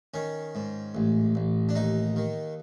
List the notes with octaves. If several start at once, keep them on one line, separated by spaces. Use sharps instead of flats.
D#3 C#4
G#2
A1
A1
D4
D#2 D#4
D#3